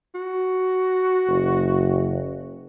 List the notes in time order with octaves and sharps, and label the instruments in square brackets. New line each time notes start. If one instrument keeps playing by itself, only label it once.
[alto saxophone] F#4
[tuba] F#1